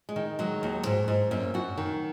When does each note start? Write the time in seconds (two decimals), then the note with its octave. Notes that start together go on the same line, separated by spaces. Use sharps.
0.09 G#3
0.16 D#3
0.39 F#3 G#3
0.63 D#2
0.86 G#2
1.08 G#2
1.31 F#2 A#3
1.54 F#2 F#4
1.78 D#3